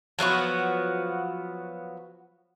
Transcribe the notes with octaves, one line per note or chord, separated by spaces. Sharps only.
F3 F#3 B3 F#4